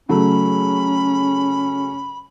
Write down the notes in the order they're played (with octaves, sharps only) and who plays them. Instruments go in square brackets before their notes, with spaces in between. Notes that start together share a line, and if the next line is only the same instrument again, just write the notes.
[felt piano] C#3 F#3 A3 [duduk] C#4 [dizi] B5